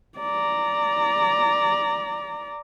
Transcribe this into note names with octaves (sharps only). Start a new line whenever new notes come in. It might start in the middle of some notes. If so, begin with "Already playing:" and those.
D5 A#5